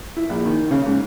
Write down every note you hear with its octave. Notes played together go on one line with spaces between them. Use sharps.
E4
A#1
D#3
C#3
G#2